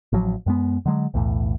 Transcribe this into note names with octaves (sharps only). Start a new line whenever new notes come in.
A1 F3 F#3
F#2 G#3 B3
D3 F#3 G#3
B1 E2 A2